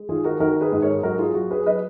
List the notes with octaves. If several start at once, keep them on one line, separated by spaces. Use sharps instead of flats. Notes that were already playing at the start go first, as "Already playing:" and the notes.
Already playing: G#3
D#3 F4 G#4
F#4 A#4
D#3 F#4 A#4
G#4 B4
G#2
A#4 C#5
F#3 F#4 A#4
F4 G#4
F#3 F#4
G#4 B4
F#3 B4 D#5